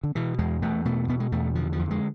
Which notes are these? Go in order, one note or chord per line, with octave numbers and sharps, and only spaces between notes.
D3
B2 E3
E2 G#3
E2 A3
B2 A3
B2 B3
G#3
E2 A3
D3 F3
F3
F2
G#3